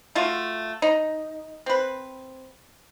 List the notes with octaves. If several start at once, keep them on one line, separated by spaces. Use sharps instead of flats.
A3 F4 F#4
D#4
C4 B4